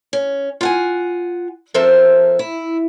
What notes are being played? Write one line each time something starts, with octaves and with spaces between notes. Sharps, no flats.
C#4
F4 F#5 G#5
F3 C4 A4 A#4 C5 E5
E4